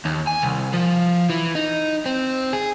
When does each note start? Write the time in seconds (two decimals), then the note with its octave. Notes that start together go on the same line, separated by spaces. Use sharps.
0.05 D#2
0.27 G#5
0.42 C2
0.73 F3
1.30 E3
1.55 D#4
2.06 C4
2.53 G#4